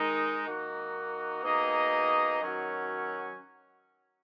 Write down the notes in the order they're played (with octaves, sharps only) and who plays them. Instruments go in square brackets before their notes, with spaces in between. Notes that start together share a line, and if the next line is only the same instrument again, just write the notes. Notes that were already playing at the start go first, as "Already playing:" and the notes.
Already playing: [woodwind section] D#3 G#3 D#4
D#3 A#3 D#4 F#4
B2 A#3 D#4 G#4 D#5
D#3 F#3 C#4 F#4